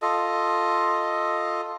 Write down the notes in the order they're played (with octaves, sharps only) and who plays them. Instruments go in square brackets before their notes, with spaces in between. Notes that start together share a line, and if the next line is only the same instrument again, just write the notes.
[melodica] F4 A4 D#5